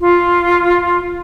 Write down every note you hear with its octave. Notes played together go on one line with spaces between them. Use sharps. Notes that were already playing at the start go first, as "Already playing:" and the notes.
F4